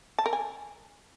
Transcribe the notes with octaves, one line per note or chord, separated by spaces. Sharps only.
A5
A#4
G#5